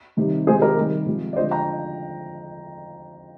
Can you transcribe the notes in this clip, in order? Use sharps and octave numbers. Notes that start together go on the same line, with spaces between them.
C3 D#3 G3
C3 D#3 G#3 G#4 C5
G4 A#4
C3 D#3 G3
C3 F3 G#3
D5
D3 F3 G#3 C5 D#5
G5 A#5